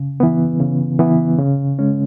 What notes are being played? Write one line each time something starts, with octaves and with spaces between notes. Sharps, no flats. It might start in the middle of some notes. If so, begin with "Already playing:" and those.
Already playing: C#3
E3 B3
C#3
E3 B3
C#3
G#3 C#4